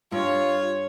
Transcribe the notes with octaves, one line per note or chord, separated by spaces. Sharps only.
G2 F4 C#5